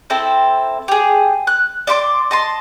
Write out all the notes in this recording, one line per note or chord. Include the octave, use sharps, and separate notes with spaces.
C4 E4 A4 C5
G4 G#4
F#6
D5 E5 C6 D6
D#5 A5 C6